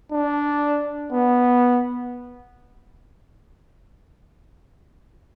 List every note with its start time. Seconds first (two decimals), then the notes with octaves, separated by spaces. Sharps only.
0.12 D4
1.13 B3